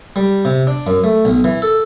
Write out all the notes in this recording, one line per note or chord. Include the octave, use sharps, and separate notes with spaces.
G3
C3
D4
F#2
A3
B1
E3
A4